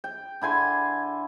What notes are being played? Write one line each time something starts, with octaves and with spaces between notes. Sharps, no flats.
G5
D3 E4 G#5 C6